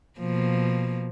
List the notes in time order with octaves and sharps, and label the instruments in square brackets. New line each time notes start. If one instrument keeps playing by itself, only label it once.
[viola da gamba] B2 F3 A#3